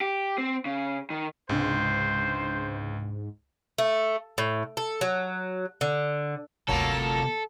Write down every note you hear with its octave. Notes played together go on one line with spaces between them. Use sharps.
G4
C4
C#3
D#3
C#2 G#2 C3 D4 C5
A3
A2
A4
F#3
D3
G1 D2 C3 F#3 A#3 F4 A4